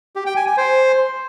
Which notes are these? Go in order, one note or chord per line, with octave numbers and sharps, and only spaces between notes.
G4
G5
G#5
G#5
C5